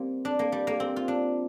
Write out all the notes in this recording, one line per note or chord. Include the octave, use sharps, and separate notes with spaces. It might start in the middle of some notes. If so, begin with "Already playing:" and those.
Already playing: G3 A#3 C4
D4
A#3
G3
A#3
C4
F4
D4